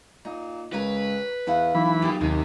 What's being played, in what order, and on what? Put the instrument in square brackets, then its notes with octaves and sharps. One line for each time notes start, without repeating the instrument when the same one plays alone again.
[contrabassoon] A#2 [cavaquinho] D#4
[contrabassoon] C#2 [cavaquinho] A#4 C#5 F#5 [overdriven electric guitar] B4
[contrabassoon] E2 [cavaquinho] A4 F5 F#5
[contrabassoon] B1 [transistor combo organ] E3 B5
[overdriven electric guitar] A#2 [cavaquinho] G4 A4 D#6
[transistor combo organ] D#2 [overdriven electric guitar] C3 [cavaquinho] G#5